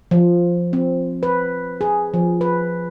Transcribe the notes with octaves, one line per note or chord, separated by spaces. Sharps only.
F3
C4
B4
G#4
F3
B4